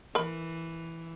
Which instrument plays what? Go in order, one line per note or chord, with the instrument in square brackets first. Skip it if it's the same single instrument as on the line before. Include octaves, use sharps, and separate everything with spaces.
[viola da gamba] E3 [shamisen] A#4 B5